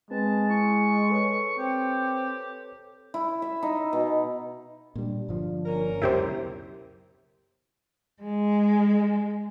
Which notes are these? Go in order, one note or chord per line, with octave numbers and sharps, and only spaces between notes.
G#3 C4 B4 A5
E4 C#6
A4 B4 C#5
C4 G4
E4
E5
D#4
B2
A#2 G3 D4
G1 F3
A#3 C#4 A#4
C#2 F#2 B2 E4 G4 C5
G#3